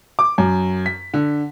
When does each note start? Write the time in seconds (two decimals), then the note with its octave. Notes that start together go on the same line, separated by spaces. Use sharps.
0.19 D6
0.38 F#2
0.86 B6
1.14 D3